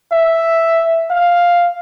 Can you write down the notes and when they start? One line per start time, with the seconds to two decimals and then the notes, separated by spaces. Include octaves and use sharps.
0.12 E5
1.11 F5